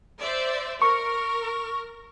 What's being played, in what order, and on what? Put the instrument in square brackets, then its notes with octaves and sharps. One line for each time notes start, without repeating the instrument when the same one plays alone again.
[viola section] C5 D5 E5
[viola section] A#4 [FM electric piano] C#6